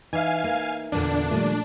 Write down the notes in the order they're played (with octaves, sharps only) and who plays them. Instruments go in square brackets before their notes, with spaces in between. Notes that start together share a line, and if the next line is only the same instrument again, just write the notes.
[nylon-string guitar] E3 [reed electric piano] D#4 E5 [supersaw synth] F5 G#5
[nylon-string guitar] A#3
[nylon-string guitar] E2 A#2 D3 [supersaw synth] D4
[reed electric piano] A#2 F3 A3 [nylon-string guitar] D#3 G3